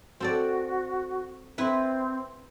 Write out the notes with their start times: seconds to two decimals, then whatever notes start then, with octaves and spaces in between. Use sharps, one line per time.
0.20 C4 F#4 A4 D5
1.58 C4 E4 B4